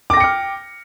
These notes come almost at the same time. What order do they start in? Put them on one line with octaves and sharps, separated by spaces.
D6 A#6 G5 C#7 F6